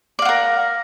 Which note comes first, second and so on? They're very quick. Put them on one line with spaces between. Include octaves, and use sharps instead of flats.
D5 F5 F#5 A#4